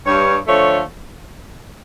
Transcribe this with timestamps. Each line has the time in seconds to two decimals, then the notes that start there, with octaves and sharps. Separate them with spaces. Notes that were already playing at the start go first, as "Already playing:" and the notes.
0.05 G2 C#5
0.47 D3 F3 A3 C#5